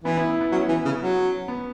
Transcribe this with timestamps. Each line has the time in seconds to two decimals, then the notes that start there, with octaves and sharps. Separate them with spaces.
0.04 E3 B3 E4
0.17 B3 E4
0.28 B3
0.41 B3
0.52 F#3 C#4
0.69 E3
0.85 C#3
1.01 F#3
1.48 B3